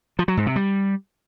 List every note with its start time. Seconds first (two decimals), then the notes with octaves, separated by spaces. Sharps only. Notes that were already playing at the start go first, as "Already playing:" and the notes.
0.19 F3
0.28 F#3
0.37 G#2
0.46 C3
0.56 G3